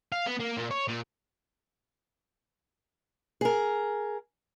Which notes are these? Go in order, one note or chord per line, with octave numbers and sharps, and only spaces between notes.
F5
B3
A#3
A#2
C#5
A#2
G#4 A#4